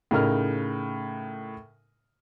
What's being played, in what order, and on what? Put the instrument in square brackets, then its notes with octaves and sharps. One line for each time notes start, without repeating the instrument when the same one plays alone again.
[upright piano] A2 C#3 D#4 A#4 F6